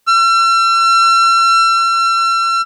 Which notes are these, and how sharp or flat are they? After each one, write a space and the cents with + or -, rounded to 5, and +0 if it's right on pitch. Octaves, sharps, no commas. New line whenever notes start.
E6 +45